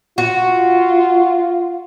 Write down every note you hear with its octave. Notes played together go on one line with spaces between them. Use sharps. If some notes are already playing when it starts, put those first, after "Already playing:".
F4 F#4